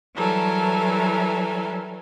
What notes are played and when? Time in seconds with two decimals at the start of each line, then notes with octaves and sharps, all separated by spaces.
0.15 E3 F#3 G3 A4 A#4 G#5